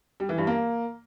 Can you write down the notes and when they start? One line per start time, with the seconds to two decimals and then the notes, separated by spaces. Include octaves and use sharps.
0.20 G3
0.29 E3
0.38 G2
0.47 A#3